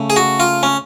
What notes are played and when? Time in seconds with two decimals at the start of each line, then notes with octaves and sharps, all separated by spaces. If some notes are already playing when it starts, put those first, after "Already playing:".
Already playing: C#3 A3
0.10 G#4
0.16 F#4
0.40 F4
0.63 C#4